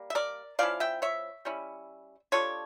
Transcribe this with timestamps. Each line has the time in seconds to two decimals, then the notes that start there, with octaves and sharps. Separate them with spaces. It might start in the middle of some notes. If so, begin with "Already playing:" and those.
Already playing: G3 A#3
0.10 E5
0.15 A#4 D5
0.59 F3 C#4 E4 D5 F5
0.80 E5 G5
1.02 C#5 E5
1.45 G3 C#4 E4
2.32 G3 D4 F4 A4 C#5